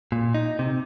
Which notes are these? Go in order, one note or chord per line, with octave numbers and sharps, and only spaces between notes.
A#2
D#4
C3